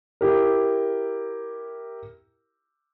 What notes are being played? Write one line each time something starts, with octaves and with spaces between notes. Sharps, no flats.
E4 G4 A#4